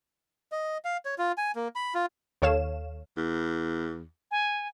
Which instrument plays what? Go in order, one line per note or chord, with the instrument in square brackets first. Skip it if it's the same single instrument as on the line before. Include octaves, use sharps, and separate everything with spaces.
[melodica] D#5
F5
C#5
F4
G#5
A#3
B5
F4
[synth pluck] D#2 A4 C#5 F5 E7
[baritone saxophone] E2
[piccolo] G#5